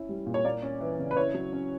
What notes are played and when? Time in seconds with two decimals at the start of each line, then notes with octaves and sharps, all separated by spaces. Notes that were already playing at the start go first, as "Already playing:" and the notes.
Already playing: C#4 E4
0.09 G3
0.27 A#2
0.34 C#5
0.45 A#3 D5
0.62 C#4
0.80 E3
0.99 C#3
1.11 B4
1.17 E4 C#5
1.34 F#3
1.53 C#4